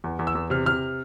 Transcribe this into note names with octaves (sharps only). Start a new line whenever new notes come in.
E2
E2
E6
E2
C3 F6
C3 F6